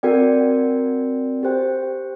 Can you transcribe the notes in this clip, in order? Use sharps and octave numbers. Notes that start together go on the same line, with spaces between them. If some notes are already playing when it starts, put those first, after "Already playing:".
C4 F#4 A#4 D5 G5
G4 C5 G5